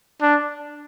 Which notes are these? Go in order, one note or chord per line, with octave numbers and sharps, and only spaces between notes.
D4